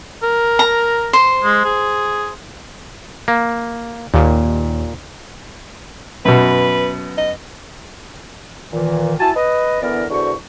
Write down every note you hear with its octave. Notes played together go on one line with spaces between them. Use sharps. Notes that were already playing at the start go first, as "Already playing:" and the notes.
A#4
A#5
C5
G#3
G#4
A#3
D#2 A#2
F#2 B2 B4
D#5
A#2 D#3 E3
E4 F#4 G#5 A5
B4 D#5
D3 E3 B3 E4 A#4 D5
E2 D3 F#4 C5 C#6